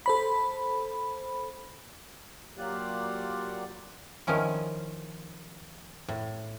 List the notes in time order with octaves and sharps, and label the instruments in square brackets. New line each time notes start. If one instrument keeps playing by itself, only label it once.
[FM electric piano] A4 C5 B5
[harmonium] F#3 A#3 F4 G4 D5 F#5
[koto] D#3 F3 C#4 E4
A2